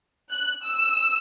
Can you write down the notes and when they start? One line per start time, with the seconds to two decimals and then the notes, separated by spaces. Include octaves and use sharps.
0.31 F#6
0.65 E6